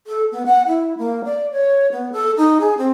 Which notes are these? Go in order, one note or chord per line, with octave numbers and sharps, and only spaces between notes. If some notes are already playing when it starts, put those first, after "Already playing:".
A4
B3
F#5
E4
A#3
D5
C#5
B3
A4
D#4
G#4
C4